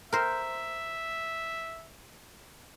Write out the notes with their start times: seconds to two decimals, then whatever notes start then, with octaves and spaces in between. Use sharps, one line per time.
0.12 A#4 C5 E5